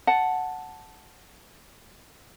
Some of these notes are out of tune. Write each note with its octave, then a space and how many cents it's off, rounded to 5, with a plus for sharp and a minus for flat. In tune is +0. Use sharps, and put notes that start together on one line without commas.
F#5 +0 A5 +0